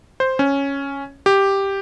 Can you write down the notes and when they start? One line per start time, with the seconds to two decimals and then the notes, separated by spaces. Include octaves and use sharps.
0.20 C5
0.39 C#4
1.26 G4